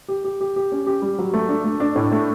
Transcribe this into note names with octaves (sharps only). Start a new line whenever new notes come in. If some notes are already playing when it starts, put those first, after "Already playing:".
G4
G4
G4
G4
C#4
G4
G3
F#3
A3
D4
A3
D4
A2
A3